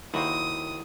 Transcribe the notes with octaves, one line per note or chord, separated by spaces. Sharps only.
D#2 E4 F#4 C5 D#6